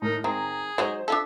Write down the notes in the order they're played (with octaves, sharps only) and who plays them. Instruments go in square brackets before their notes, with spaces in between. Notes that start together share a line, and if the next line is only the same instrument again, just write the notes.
[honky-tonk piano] A2 A#4 [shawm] D#4
[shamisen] D#3 C4 [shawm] G#4 [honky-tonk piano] A#5
[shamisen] F#3 G#3 D#4 [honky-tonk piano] C5
[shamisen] D4 F4 A4 [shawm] E5